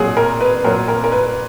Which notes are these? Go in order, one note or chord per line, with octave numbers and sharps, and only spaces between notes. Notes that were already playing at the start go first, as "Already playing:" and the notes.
Already playing: A#2 F#3 G#4
A#4
B4
A#2 F#3 A#4
A#4
A#4
B4